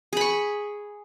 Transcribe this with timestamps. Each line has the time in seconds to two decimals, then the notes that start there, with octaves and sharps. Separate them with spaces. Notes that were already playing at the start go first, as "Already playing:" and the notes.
0.13 G#4
0.17 B5
0.21 C#6